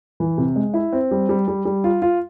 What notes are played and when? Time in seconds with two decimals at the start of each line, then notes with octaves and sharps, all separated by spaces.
0.20 E3
0.38 C3
0.56 G#3
0.74 E4
0.93 C4
1.11 G3
1.29 G3
1.48 G3
1.65 G3
1.84 F4
2.02 F4